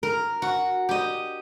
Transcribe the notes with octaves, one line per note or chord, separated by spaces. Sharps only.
A#4
F#4
G4 D#5